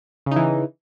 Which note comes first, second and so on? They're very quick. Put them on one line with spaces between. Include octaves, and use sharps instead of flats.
C#3 D#4 E3